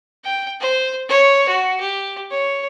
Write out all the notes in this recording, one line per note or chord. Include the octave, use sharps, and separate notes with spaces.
G5
C5
C#5
F#4
G4
C#5